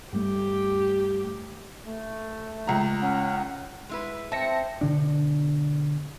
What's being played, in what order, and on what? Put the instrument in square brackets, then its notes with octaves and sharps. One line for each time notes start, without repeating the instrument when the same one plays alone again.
[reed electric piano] G2 G3 A3 [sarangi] G4
[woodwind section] A3
[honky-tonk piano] C#2 A#5
[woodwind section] C#4 [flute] F#5
[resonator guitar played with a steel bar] G#3 E4 B4
[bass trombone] C4 [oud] E5 [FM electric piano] A5 A#6 C#7
[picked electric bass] B2 D3 D4